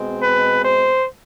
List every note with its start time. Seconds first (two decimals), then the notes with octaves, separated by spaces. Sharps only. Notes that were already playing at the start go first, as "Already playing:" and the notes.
Already playing: B2 G#3 C4
0.20 B4
0.62 C5